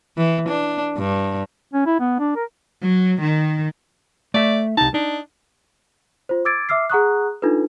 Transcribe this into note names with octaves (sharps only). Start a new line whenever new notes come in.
E3
D4
G2
C#4
E4
B3
D4
A#4
F#3
D#3
A3 D5 E5
C2 D#4 A5
D4 D#4
F4 C5
D6 E6 G#6 A6 D7
E5 D6 E6 F6 C7
G#4 F#5 A#5 C#6 D#6 F#6
D4 D#4 F4 A4 B4